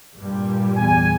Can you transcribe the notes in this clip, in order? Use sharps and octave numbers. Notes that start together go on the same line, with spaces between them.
G2 A#2 G3
E2 G#5